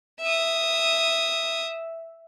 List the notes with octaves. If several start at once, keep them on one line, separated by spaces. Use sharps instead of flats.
E5 D#6